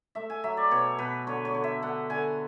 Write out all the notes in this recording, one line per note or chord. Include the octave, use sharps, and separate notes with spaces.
A3 E5
G#5
F#3 E5
D5
B2 C#5
B2 B4
D3 C#5
C#5
D3
E5
D3 F#5
D3 G#5